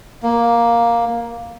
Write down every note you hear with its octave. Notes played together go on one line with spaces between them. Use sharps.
A#3